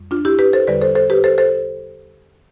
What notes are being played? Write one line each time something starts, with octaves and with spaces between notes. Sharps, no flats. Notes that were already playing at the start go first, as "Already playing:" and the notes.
Already playing: F2 G3
D4 F4
E4 G4
G4 B4
A4 C5
E2 D3 G3 B4 D5
A4 C5
A4 C5
G4 B4
A4 C5
A4 C5